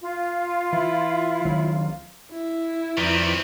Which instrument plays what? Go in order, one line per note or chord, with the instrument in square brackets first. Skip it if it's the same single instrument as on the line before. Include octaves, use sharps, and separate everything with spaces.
[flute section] F4
[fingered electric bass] E3 [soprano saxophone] E4
[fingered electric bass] C#2 D#3 F#3
[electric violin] E4
[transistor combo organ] F2 B4 D5 [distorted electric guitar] D#3 C4